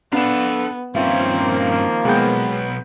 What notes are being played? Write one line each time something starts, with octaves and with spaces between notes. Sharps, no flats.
B3 D4 A4 F5 E7
G2 D#3 F3 A#3 C4 C#4 F4 E5
B1 G#3 B3 G5 G6